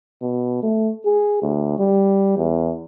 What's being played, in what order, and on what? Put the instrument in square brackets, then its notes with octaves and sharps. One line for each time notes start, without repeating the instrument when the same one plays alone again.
[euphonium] B2
A3
G#4
D2
G3
E2